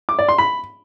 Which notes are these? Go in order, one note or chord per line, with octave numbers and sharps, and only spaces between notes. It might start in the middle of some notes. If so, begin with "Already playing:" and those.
D6
D5
C6
B5